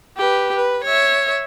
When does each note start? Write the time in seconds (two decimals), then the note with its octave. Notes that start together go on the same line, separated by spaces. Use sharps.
0.17 G4 B4
0.55 B4
0.84 C#5 E5